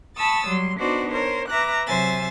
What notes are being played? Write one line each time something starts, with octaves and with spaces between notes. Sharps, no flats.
A5 B5 C#6 D#6 E6 A6
F#3 G3 C6
B3 D4 D#4 F#4 C5 D5
A#4 C5 C#5
B4 E5 A#5 D6 F#6
C3 F#3 C5 E5 G#5 A6